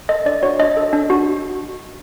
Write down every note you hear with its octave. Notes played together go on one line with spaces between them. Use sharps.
A4 D#5
D4 D5
F#4 C#5
D4 D#5
A4
D4
F#4